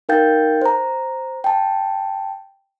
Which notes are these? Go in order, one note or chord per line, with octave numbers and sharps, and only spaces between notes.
D#4 A#4 F5 G5 G6 A6
C5 A#5
G5 A5